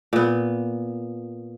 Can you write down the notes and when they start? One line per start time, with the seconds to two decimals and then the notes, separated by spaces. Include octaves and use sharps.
0.13 A#2 B3